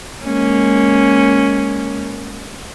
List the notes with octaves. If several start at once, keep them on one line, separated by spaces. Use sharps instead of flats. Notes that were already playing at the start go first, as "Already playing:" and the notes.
G#3 A#3 C#4